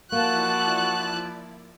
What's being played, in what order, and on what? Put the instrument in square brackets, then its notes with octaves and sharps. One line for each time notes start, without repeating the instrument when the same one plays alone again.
[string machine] F3 E4 D5 [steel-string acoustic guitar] A#3 [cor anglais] F#4 [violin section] A5 F#6